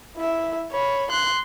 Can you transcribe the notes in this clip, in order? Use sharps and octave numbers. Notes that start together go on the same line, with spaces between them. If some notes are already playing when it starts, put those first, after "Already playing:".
E4 E5
C#5 B5
C6 F#6